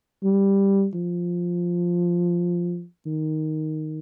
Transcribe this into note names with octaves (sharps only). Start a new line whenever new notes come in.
G3
F3
D#3